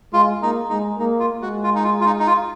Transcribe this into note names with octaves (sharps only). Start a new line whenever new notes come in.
G#3 F4
A#3 D#4
G#3 D#4
A#3 D#4
F4
G#3 F#4
F4
D#4
F4
F4
D#4
D#4
F4